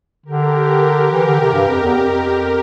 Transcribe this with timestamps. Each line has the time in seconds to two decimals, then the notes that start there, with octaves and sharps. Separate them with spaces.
0.25 D3 G4 A#4
1.11 E3 G4 A#4
1.25 D3
1.40 C3
1.53 G2
1.68 F2
1.83 E2
1.97 F2